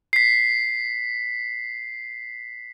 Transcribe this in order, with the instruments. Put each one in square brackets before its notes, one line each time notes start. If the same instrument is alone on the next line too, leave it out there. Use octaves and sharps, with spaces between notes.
[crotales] B6 C7